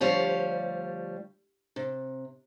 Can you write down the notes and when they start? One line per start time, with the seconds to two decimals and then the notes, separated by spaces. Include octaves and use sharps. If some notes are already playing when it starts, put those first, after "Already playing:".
0.01 D2 F3 G3 C#5 F5
1.76 C3